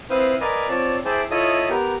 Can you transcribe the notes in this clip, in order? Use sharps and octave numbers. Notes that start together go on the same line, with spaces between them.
C4 E4 B4 C5 F5 D#6
A#4 B4 D5 D#5 F5 G#5
C4 F4 C#5 D5 A5
E4 G#4 C5 G5 A5 D6
E4 F4 A4 C#5 D#5 D#6
B3 G4 A#4